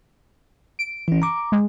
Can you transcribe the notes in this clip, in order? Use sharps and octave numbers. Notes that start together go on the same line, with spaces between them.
D7
E3 C#4
A#5 D6
G#3